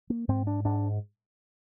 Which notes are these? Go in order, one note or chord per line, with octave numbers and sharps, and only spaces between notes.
A#3
G#2 C4
D4
G#2 D4